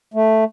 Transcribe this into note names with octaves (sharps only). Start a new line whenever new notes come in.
A3